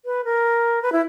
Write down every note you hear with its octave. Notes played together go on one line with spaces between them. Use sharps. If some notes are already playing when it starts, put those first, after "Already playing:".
B4
A#4
B4
E4